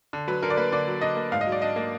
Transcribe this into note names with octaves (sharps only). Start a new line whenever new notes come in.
D3
F#3 B4
D3 A#4
D5
A#3 B4
D3 D5
F#3
D3 D#5
A#3
G#2 F5
D#5
F#3
D5
D4 D#5
A#3